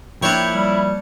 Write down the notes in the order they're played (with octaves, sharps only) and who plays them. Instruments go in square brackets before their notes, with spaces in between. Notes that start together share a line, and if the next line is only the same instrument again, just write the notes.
[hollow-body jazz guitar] F3 A#3 [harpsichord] D4 C#5 [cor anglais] E4 [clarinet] G5
[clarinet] G3